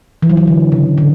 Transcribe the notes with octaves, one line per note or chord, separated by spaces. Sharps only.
E3
F#3
E3
D3
C#3
D3